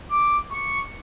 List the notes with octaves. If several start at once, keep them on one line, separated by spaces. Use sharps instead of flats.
D6
C#6